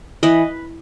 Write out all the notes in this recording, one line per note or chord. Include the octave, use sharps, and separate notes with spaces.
E3 B4 D#5